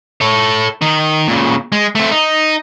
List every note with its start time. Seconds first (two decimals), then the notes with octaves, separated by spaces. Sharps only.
0.21 A4 C#5
0.82 D#3 D#4
1.28 A#2 C#3
1.72 G#3
1.95 A3 C4
2.11 D#4